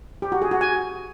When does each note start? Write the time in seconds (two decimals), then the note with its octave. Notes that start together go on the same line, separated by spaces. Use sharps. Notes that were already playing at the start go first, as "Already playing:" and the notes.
0.22 G4
0.32 F#4
0.42 G#4
0.51 F#4
0.61 G#5